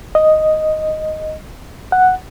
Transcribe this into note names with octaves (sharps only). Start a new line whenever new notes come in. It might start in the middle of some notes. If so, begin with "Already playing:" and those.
D#5
F#5